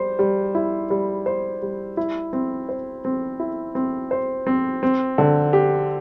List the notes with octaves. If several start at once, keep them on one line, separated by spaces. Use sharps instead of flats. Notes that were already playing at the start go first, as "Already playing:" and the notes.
Already playing: G3 C5
G3
E4
G3
C5
G3
E4
C4
C5
C4
E4
C4
C5
C4
C4
D3
G4